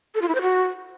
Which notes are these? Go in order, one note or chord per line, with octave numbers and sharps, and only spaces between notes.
A4
F4
E4
C5
F#4